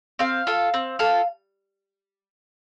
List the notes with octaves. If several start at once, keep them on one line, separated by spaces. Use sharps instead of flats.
C4 F5
F4 A4
C4
F4 A4